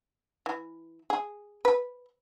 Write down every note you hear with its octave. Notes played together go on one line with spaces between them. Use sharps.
E3
G#4
B4